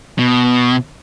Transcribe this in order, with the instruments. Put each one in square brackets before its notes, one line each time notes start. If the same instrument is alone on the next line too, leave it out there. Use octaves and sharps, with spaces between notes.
[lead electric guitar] B2